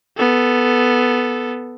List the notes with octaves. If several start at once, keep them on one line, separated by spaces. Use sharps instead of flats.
B3 A4